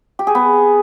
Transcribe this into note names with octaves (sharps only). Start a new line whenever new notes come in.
G4
G#4
B3